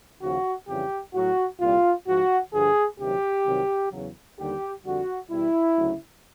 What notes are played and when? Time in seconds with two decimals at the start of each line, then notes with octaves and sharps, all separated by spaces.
0.20 D#2 C#3 F3 F#4
0.67 F2 C#3 E3 G3 G4
1.13 A2 F#3 F#4
1.59 C2 A#2 G3 F4
2.06 G#2 F3 F#4
2.52 G2 D3 F3 G#4
2.98 D2 C3 D#3 F#3 G4
3.46 C2 C3 D#3 F#3
3.91 E2 C#3 F#3
4.38 D#2 D3 G3 G4
4.84 F2 D3 G3 F#4
5.30 E2 B2 G3 E4
5.77 D2 C#3 F#3